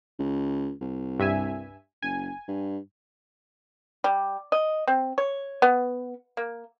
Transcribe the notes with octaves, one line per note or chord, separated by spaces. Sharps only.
C#2
C2
G2 E5 G#5
F#1 G#5
G2
G3
D#5
C4
C#5
B3
A#3